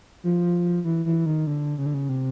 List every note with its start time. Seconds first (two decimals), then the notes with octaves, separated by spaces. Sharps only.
0.23 F3
0.84 E3
1.06 E3
1.26 D#3
1.47 D3
1.78 C#3
1.86 D3
1.94 C#3
2.09 C3